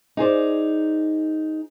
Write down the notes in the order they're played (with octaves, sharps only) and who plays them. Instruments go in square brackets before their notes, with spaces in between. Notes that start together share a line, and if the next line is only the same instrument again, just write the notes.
[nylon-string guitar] D#4 G#4 C5 D5